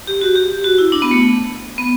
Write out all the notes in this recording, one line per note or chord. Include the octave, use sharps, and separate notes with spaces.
G4
F#4
G4
F#4
E4
D4
B3
A3
B3